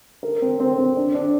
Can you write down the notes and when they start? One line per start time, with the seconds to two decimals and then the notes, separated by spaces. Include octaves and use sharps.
0.23 A#4
0.42 C4
0.60 C4
0.78 C4
0.97 D4
1.15 D4